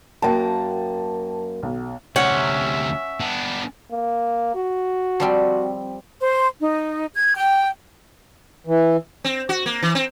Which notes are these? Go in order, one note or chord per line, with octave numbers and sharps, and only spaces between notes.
F#2 A#3 G5 A5
B1
D2 C3 C#4 E5 F#5
B3 D4
A#3
F#4
F3 G3 C4
C5
D#4
G#6
G5
E3
C4
F#4
A#3
E3
C4